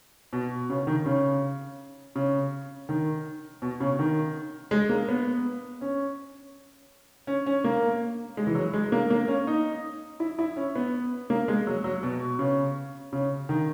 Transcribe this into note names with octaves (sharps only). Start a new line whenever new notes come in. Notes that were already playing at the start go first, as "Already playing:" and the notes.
B2
C#3
D#3
C#3
C#3
D#3
B2
C#3
D#3
G#3
A#3
B3
C#4
C#4
C#4
A#3
G#3
E3
F#3
G#3
A#3
A#3
C#4
D#4
E4
E4
C#4
B3
A#3
G#3
F#3
F#3
B2
C#3
C#3
D#3